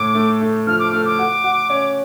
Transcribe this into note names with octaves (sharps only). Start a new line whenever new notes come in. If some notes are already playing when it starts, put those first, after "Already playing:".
Already playing: A2 D6
A3
A3
F3 F6
D6
A3 F6
D6
F#4
F#4
C#4